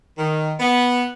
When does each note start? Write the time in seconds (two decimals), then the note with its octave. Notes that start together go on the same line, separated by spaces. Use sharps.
0.18 D#3
0.60 B3